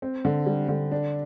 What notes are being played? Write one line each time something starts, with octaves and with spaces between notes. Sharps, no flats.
C4
D3
G3
D3
D4